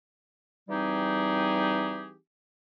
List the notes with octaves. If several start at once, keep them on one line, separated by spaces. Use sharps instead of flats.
E3 G3 C4 D#4 G4 G#4